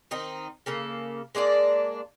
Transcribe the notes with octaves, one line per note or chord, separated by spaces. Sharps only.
D#3 C4 D#4
C#3 A#3 A4
G#3 A#3 D4 D5